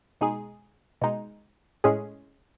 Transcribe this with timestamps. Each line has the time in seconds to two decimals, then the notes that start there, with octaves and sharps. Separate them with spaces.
0.21 B2 G#3 D#4 G#4
1.02 B2 G#3 D#4
1.84 A2 G#3 C#4 G#4